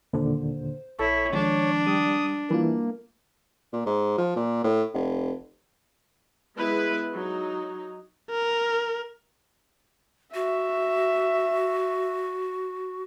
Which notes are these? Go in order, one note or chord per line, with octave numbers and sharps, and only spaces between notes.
D#2 A#2 D3 C5
A#1 E4 A4 C#5
D#3 F3 G#3 D4
G3 D#6
E3 G3 A#3 E4 F4
A#2
G#2
F3
A#2
A2
F1
G#3 B3 E4 B4
F#3 D#4
A#4
F#4 E5